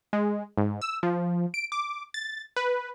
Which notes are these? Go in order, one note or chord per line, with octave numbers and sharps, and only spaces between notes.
G#3
G#2
E6
F3
D7
D6
A6
B4